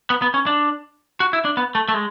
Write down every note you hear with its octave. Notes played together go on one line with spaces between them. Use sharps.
B3
B3
C#4
D4
F#4
E4
D4
B3
A3
A3
G#3